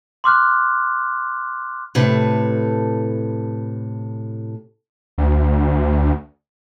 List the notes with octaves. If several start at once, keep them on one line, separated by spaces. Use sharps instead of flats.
C6 D6 F6 F#6
A2 C3 A4 B4
D2